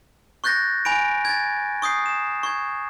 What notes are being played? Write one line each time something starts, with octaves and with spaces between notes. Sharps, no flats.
C#6 F#6 G6 A6 A#6
G#5 B5 D7
G#6 A6
C#6 D#6 G6 C7
E7
C#6 G#6